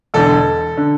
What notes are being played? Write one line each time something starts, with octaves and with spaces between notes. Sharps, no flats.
E1 E2 D3 A4
D3